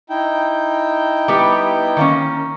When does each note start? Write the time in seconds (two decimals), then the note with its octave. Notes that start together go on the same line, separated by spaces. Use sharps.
0.10 D#4 E4 G5
1.28 G3 B3 G4
1.97 D#3 A#3 C#4